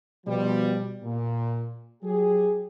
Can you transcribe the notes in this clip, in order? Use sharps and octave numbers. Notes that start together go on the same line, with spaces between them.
B2 F3 G3
A#2
F#3 G4 G#4